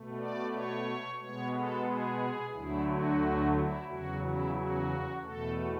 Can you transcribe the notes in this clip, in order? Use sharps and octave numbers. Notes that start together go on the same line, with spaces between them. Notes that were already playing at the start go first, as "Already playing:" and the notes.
Already playing: B2 A3
D5
C#5
B2 G#3 B3 C#5
A4
G#4
D2 D3 F#3 A3 E4
F#4
E4
E2 C#3 F#3 F#4
E4
F#4
E2 B2 A3 A4